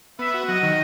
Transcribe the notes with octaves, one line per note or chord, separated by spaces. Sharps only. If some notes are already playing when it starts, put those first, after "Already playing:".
B3 E5
F#4
F#3 D#5
D#3